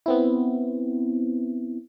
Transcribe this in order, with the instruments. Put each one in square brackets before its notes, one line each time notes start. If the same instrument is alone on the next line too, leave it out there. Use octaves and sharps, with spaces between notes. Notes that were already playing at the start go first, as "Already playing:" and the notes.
[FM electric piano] B3 C4 E4